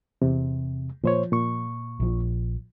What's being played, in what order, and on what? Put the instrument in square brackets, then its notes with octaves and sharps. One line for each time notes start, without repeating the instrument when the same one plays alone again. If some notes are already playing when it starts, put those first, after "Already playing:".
[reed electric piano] E2 C3
[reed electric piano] A#2 C5 C#5 [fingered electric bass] F3
[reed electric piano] A#2 C#6
[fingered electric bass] A#1 F3